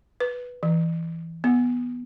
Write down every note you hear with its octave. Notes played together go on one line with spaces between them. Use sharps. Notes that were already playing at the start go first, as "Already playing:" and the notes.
B4
E3
B3